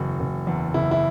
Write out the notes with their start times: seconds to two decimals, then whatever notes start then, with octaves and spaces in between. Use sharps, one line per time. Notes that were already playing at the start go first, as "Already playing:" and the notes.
Already playing: F#1 E2 F#4
0.20 F#1
0.47 E2
0.74 F#1 E4
0.91 E4